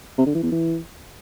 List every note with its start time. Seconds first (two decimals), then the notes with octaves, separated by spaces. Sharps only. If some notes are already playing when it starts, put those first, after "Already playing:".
0.18 C3
0.26 D3
0.35 E3
0.43 E2
0.51 E3